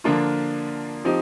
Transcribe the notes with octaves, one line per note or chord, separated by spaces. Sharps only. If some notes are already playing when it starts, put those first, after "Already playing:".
D3 F3 A#3 D4 F4
F3 C4 D#4 G4